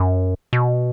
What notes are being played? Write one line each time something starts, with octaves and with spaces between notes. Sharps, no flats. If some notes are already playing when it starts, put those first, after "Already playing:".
Already playing: F#2
B2